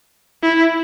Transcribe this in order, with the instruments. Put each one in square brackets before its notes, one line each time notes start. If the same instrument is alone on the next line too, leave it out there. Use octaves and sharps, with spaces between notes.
[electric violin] E4